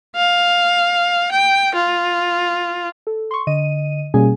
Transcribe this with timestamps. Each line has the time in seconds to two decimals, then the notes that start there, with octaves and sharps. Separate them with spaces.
0.16 F5
1.32 G5
1.75 F4
3.07 A4
3.31 C6 C#6
3.47 D3 D#5 D#7
4.14 B2 G3 A#3 C#4 G#4 G#5